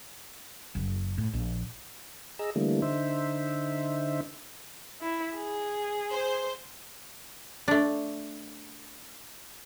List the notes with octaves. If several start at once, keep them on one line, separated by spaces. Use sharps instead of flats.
F#1
A2
A#1
G#4 D#5 A#5 E6
D3 E3 G3 A3 A#3
D3 D#4 C5 E5
E4
G#4
C5
A3 D4